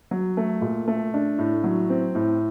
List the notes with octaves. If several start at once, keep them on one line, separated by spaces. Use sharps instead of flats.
F#3
A3
A#2
A3
D4
A2
F#3
C4
A2